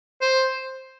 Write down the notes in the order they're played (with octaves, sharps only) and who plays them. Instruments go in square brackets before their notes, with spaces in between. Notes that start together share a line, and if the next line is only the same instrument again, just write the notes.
[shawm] C5